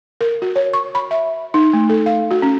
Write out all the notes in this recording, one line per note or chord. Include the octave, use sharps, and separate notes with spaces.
A#4
F#4
C#5
C#6
B5
E5
D#4
A3
A4
F5
F#4
C#4